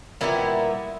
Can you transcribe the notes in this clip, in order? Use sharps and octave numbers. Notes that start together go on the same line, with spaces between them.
A#2 G3 B3 E4